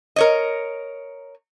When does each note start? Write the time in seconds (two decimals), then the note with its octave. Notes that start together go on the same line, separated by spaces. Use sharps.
0.16 A#4 C#5 D#5